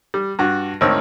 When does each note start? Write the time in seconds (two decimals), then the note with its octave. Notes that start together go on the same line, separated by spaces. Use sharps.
0.14 G3
0.39 G2 F#4
0.81 G#1 D2 D#3 C4 C#5 E6